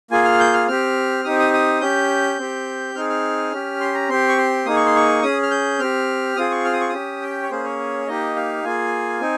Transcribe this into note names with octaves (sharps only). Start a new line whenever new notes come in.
A#3 F4 G#4 G#5
F6
G6
F6
C4 G4 F6
C4 D#4 G4 D#6
D#6
D#6
C#4 G4 G6
C4 G4
C4 D#4 G#4 F6
F6
C#4 G4
C6
A#5
C4 G4 C6
C#6
C6
A#3 D#4 G#4 D#6
C#6
C6
C#6
C#4 G#4 D#6
F6
G6
C4 G4 F6
C4 F4 G#4 D#6
C#6
F6
D#6
C#6
C#4 G4 D#6
G5
C#5
A#3 C#4 G#4 C5
C#5
A#3 D#4 G4 D#5
F5
A#3 F4 G#4 G#5
C4 D#4